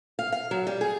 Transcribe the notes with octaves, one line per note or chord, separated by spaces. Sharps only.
F5
F5
F#3
G3
G#4